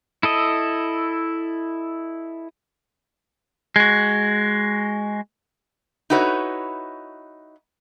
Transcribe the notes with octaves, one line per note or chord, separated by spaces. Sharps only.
E4 A4 D#5
G#3 F#4
D#4 E4 F#4 B4 C#5